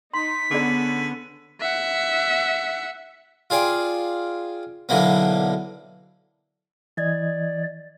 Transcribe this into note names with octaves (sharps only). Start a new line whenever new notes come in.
D#4 C6 B6
D3 B3 C#4 G#4 D5
E5 F#5
F4 G#4 D5 G5
B1 D3 E3 A#3 B3
E3 D5 D#5 G#6